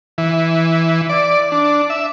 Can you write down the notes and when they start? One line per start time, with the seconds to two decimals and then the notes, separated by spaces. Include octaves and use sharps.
0.18 E3
1.10 D5
1.52 D4
1.90 E5